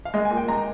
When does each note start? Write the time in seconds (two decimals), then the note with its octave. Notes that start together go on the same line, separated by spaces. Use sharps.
0.05 F5
0.14 G#3 D#5
0.25 G#5
0.31 A#2
0.37 G5
0.48 G#3 A#5